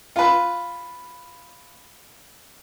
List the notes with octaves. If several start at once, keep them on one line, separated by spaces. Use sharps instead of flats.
F4 B4